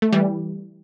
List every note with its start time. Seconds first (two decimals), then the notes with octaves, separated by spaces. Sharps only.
0.02 A3
0.13 E3 G3